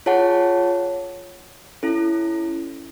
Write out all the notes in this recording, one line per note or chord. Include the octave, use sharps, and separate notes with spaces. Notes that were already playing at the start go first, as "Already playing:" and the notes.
F4 G#4 C#5 F#5 A5
C#4 E4 A4